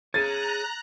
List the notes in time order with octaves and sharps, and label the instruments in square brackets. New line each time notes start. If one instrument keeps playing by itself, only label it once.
[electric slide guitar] G#4 C#5 [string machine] A#5 F#6 [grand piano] A6